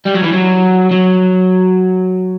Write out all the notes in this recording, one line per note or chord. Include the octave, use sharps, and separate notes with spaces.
G3
F#3
E3
F#3
F#3